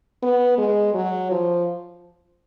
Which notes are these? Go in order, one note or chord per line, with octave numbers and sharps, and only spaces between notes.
B3
G#3
F#3
F3